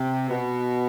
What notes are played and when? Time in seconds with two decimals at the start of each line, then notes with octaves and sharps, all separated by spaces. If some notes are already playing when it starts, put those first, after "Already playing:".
Already playing: C3
0.29 B2